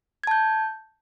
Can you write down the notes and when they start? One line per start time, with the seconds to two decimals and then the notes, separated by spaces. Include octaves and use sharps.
0.24 G#6
0.27 A5
0.31 G6